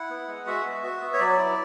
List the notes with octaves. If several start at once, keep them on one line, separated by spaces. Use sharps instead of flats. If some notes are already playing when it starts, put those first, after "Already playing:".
Already playing: E4 F#5
B3
G#3
F#4 E5
B3
F#4
B3
C#5
F#3 D5
E4